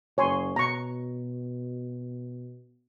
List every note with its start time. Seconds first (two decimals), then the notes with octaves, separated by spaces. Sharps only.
0.18 F#1 C#5 G#5 C6
0.56 B2 A#5 C#6